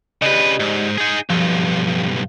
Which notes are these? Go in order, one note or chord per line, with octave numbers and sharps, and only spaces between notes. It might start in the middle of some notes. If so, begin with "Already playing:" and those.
C#3 G4 B4 D5 D#5
G#2
D#4 G#4
B1 G2 F3